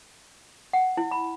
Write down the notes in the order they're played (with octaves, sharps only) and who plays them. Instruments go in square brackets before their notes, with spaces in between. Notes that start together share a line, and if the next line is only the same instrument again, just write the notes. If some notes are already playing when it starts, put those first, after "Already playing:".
[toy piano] F#5
E4
B5